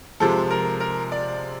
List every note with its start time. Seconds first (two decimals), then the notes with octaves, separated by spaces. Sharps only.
0.20 C3 F3 G#3 A4
0.51 A#4
0.80 A#4
1.12 D5